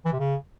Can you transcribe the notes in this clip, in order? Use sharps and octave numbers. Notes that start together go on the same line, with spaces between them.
E3
C3
C#3